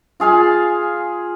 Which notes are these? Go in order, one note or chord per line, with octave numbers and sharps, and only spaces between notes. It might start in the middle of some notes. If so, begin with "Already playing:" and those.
F4 G#4 F5 G#5